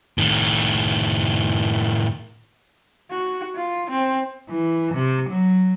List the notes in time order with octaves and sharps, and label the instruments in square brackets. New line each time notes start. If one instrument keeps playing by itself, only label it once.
[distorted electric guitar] A2 D#3
[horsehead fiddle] F#4
F4
C4
[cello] E3
C3
F#3